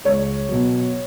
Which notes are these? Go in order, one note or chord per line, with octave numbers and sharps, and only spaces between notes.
C#2 C#5
B2 F#3